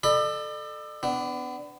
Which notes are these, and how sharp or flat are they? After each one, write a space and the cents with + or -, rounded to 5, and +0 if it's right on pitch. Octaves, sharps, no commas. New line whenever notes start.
A4 +0 D5 +40 B5 -5
B3 +30 D4 +0